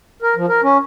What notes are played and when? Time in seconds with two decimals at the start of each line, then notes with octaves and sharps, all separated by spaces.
0.22 A#4
0.36 F3
0.49 A#4
0.63 C#4